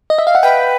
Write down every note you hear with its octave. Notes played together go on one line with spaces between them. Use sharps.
D#5
E5
F5
F#5
B4 G5